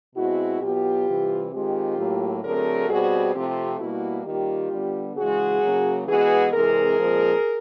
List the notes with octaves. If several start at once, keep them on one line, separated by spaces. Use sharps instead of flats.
B2 G#3 C4 E4 F#4
B2 F#3 B3 F4 G4
C3 E3 G3
D#3 G#3 C4 F4 G4
A2 F#3 A#3
D3 F#3 A3 C4 G#4 A#4
B2 G3 C4 F#4 G#4
C3 F3 A3 C4 F4 G4
B2 G3 A#3 E4 F#4
D#3 G3 A#3 F4 G4
D3 G3 B3
C#3 E3 G#3 F#4 G#4
C#3 F#3 A#3
E3 G#3 B3 F#4 G#4
C3 E3 G#3 C4 G#4 A#4
A#2 F3 G#3 C4